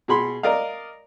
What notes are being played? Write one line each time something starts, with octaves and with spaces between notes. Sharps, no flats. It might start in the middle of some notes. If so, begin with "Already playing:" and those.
B2 G#4 B5 C6
A#4 D5 D#5 F5